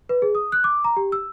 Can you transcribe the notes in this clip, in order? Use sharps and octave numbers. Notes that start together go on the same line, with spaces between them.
B4
G#4
D#6
F#6
D6
A#5
G4
E6